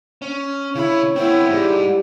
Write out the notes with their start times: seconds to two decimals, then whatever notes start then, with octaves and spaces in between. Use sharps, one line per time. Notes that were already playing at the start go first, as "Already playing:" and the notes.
0.22 C#4
0.75 C#3 E4 C#5 B5
1.16 B3 C4 E4
1.49 G#2 G3